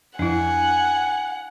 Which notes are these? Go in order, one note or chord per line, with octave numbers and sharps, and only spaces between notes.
F2 D4 E4 F#5 G#5